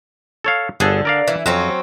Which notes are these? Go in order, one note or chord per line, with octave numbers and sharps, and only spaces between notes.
A4 C#5 F5
G1 D3 G#4 A4
A#4 D5 F5
E3
F2 F#3 C4 C#4